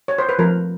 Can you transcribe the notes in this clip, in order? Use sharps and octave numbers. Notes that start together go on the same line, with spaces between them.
C#5
C5
B4
F3 A3 C4 A#4